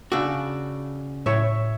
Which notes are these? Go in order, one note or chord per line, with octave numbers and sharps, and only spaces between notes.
C#3 D4 F#4 A4
A2 C#5 E5